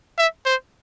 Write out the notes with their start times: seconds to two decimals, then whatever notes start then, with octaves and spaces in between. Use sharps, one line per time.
0.18 E5
0.46 C5